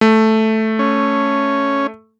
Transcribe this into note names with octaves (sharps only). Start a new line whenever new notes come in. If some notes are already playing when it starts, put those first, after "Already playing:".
A3
C#4